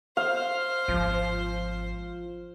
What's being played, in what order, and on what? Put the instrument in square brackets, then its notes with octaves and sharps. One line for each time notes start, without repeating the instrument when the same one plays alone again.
[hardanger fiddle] C5 [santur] F5
[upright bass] G#1 [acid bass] F3